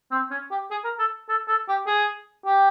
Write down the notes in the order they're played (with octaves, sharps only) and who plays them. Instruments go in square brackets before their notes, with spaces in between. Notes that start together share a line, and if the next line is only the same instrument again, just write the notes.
[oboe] C4
C#4
G4
G#4
A#4
A4
A4
A4
G4
G#4
G4